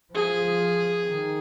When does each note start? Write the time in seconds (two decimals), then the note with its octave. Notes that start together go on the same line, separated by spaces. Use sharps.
0.14 F3 G#4
1.07 D#3